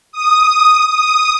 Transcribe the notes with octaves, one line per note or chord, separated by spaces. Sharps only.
D#6
D#6